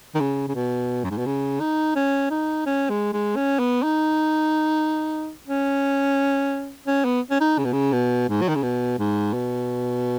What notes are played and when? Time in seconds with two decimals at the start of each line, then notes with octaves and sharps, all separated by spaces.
0.15 D#3
0.20 C#3
0.48 C#3
0.55 B2
1.04 F#2
1.11 G#2
1.18 B2
1.26 C#3
1.60 D#4
1.96 C#4
2.30 D#4
2.66 C#4
2.90 G#3
3.13 G#3
3.36 C#4
3.59 B3
3.83 D#4
5.47 C#4
6.87 C#4
7.05 B3
7.30 C#4
7.40 D#4
7.58 C#3
7.65 B2
7.72 C#3
7.93 B2
8.29 G#2
8.42 F#3
8.49 D#3
8.55 C#3
8.63 B2
8.98 G#2
9.33 B2